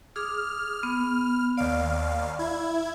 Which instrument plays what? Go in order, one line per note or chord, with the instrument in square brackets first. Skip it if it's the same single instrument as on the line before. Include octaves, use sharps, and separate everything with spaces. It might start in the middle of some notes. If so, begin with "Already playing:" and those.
[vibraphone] G#4 D6 D#6 [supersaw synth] F6
[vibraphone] B3
[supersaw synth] D#2 F5 [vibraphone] D5
[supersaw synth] E4 G#6